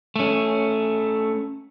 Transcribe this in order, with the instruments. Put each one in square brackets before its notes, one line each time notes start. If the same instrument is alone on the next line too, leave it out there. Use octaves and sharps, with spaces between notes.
[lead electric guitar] A3 C#4